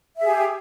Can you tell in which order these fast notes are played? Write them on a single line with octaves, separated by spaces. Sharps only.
E5 G#4 G4